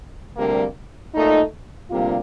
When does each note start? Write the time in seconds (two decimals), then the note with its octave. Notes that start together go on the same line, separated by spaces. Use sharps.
0.37 D2 C3 G3 A#3
1.14 A#2 A3 D#4
1.90 D2 C3 G3 A#3 F4